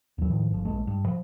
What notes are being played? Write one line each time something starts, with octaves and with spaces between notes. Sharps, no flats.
D#2 F#3
A2 D#3 F3
G1 F3
A#1 G#2 G#3 A3
G2
F3